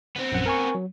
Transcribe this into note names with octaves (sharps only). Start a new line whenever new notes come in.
B3 C4
A#1 F#2 F#5
A#4 G#5 C#6
F#3